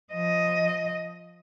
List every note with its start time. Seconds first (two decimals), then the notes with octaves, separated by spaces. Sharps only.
0.13 F3 D#5